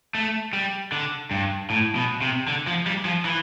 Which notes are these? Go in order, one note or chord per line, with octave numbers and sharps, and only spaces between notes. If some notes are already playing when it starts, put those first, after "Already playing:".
A3
G3
D3
G2
A2
B2
C3
D3
F3
G3
F3
E3